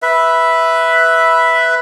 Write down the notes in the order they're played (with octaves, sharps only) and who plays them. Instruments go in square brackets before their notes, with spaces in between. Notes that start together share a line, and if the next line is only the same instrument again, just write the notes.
[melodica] B4 E5